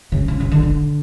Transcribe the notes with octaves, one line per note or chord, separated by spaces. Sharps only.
C#3
C#3
C#3
D3
D3